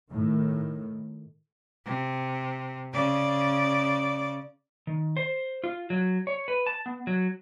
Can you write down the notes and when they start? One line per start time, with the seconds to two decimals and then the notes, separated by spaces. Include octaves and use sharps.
0.10 A2 D#3
1.85 C3
2.93 C#3 D5
4.87 D#3
5.17 C5
5.64 F4
5.90 F#3
6.27 C#5
6.48 B4
6.67 A5
6.86 B3
7.07 F#3